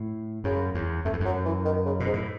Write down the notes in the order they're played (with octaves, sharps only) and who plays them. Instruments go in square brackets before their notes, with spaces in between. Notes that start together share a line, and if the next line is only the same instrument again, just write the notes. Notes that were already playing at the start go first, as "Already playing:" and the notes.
Already playing: [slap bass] A2
[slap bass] F#2 [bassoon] C#3
[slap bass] E2
[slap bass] F#2 [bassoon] A3
[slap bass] E2
[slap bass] F#2 [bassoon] F#3
[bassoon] E3
D#3
C#3
[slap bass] B2
[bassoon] G#2
[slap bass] A2